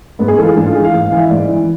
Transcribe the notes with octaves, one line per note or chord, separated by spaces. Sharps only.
G#2 B3
G#4
E3 F4 A4
G#4
G#2 D4
F4
E3 G#4
F5
G#2
F5
E3
E5
G#2 D5
E3